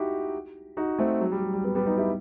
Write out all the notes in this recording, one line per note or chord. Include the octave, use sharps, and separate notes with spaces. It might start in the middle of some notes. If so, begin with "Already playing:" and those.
Already playing: D#4 E4 F#4 G4
D#4 F#4
A3 C4
F#3
G3
F#3
G3
G3 B3
G3 B3
B3 D#4
E4 G4